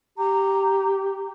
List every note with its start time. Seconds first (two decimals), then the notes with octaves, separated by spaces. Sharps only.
0.18 G4 A#5